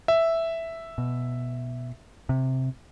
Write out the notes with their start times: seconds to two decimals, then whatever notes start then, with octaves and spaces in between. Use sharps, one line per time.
0.08 E5
0.98 B2
2.29 C3